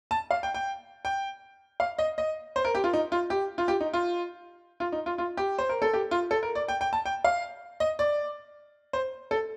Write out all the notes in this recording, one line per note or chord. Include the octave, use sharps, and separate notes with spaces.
A5
F5
G5
G5
G5
F5
D#5
D#5
C5
A#4
G4
F4
D#4
F4
G4
F4
G4
D#4
F4
F4
D#4
F4
F4
G4
C5
A#4
A4
G4
F4
A4
A#4
D5
G5
G5
A5
G5
F5
D#5
D5
C5
A4